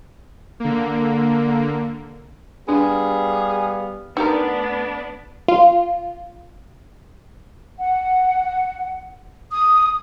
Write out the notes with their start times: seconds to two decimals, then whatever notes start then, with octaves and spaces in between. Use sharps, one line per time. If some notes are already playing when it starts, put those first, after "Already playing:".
0.60 D3 A#3
2.68 G3 B3 D4 G#4 F5
4.17 A3 B3 D4 D#4 G4 A#4
5.48 F4
7.79 F#5
9.52 D#6